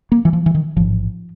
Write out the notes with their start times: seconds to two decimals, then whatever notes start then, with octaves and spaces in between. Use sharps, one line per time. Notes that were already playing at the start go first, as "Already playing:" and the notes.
0.12 A#3
0.25 E3
0.33 F3
0.46 E3
0.55 D#3
0.76 A1 G#2 F3